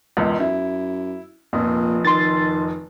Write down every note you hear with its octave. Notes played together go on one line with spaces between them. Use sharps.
E1 C#2
F#2 E4
F1 F2 A#2
D#3 C6 A6